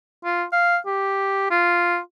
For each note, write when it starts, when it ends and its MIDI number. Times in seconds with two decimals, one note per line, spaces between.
0.25 0.44 65
0.53 0.77 77
0.86 1.46 67
1.51 1.98 65